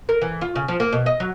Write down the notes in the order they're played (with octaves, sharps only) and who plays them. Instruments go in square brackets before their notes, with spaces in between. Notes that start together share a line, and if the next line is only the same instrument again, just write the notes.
[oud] A#4
E3
F4
C#3
F3
A#3
B2
D#5
F#3